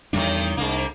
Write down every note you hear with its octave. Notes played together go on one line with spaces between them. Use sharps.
E2 A2 D#3 G3 D4
C2 G#2 A#3 D4